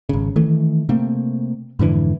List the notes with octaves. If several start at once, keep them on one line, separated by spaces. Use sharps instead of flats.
G#1 C#3
D#3 E3 A3
C3 A3 A#3 C4
F2 G#2 D3 E3